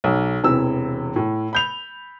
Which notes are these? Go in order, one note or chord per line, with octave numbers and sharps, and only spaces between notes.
B1
E1 C3 E3 E6
A2
B5 G6 F7